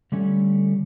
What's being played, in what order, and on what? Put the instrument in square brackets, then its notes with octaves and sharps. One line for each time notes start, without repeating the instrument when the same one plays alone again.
[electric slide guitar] D3 G3 A3 C#4